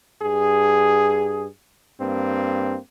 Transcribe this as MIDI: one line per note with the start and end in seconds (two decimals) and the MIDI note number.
0.22 1.46 43
0.22 1.46 68
2.01 2.77 43
2.01 2.77 58
2.01 2.77 60